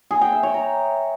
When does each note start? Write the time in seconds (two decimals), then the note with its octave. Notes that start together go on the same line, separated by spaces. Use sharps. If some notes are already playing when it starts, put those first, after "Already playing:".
0.11 G#4
0.21 G5
0.32 E5
0.43 C#5
0.54 A#5